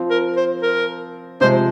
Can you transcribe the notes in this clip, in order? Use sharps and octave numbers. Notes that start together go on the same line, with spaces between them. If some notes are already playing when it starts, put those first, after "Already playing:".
Already playing: F3 C4 F4
A#4
C5
A#4
C3 F3 G#3 C5